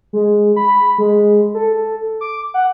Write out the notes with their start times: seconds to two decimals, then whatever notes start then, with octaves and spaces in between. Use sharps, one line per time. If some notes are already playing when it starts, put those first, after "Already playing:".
0.13 G#3
0.56 B5
0.98 G#3
1.54 A4
2.21 D6
2.54 F#5